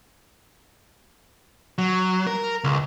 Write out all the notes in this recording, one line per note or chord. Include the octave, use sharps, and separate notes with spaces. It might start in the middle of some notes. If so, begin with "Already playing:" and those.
F#3
A#4
C#2